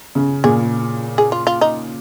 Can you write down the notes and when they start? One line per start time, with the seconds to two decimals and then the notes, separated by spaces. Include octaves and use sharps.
0.15 C#3
0.44 A#2 G#4
1.18 G#4
1.32 F4
1.47 F4
1.61 D#4